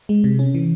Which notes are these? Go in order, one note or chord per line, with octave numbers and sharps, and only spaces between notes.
G#3
C3
C#4
E3